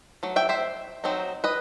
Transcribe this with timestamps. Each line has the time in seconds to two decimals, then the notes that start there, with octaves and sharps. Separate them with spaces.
0.23 F#3 A3
0.36 E5 G5
0.49 C5 E5
1.04 F#3 C4 D#4
1.44 B4 D#5